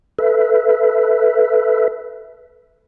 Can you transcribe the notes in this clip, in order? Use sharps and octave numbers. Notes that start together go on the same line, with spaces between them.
A4 B4 E5